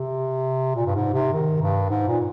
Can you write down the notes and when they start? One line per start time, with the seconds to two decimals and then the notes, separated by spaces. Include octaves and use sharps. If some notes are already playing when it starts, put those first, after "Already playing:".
Already playing: C3
0.76 A#2
0.86 G2
0.95 G#2
1.14 C3
1.33 D#3
1.62 G2
1.90 G#2
2.08 A#2